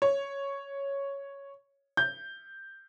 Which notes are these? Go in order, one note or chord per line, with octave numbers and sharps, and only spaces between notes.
C#5
G6